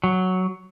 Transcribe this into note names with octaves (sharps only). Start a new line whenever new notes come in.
F#3